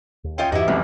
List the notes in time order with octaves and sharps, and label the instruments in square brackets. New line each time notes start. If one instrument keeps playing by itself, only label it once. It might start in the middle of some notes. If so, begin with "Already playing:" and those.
[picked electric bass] D#2
[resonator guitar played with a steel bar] C#4 F4 D#5 [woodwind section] C#5 G5
[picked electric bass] E2 G2 [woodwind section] E3 G4 [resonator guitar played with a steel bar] E4 F#4 [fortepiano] D#5
[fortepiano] C2 F2 [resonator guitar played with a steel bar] F#3 [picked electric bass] A3 C4 C#4